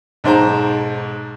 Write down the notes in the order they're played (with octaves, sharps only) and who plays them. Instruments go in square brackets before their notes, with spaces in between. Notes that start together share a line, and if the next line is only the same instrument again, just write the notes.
[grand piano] B1 G#2 C5 A#5